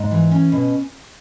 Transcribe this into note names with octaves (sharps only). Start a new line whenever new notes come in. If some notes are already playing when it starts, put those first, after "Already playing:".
Already playing: G#2
E3
C#4 G#5
B2